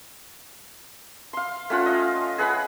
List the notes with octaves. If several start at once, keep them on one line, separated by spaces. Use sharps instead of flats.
F5 C6
A3 C#4 F4 F#5
D#5 F5
G#4 B4 F#5 B5